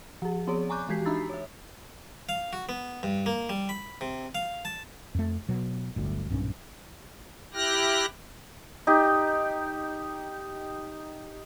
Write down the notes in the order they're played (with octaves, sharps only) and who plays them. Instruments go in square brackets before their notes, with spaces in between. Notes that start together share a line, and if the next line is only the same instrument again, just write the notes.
[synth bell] F3 G#4
F3 B3 C4 G#4 C#5 D5
G#5 A#5 C#6 D6 F#6 G6
E3 G#3 F#4 G4 B6 C7
D4 D#4 A#5 B5 E6 A6
C#5 E5
[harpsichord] F5
F#4
B3
G2
A#3
G3
B5
C3
F5
A5
[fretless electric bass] F2 A3
B2 F#3
D1 G1 D2
B1 G2 A#2 C#4
[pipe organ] E4 G4 G5 F6 F#6 A#6
[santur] D#4 G4